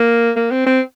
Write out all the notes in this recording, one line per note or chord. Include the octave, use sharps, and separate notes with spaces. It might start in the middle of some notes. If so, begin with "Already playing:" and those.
Already playing: A#3
A#3
C4
C4